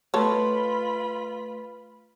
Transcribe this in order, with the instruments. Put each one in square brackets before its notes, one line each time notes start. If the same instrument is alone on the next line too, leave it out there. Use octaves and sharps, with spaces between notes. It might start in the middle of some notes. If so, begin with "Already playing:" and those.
[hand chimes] A3 B4 C6 [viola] F4 B5 [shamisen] A4 C#5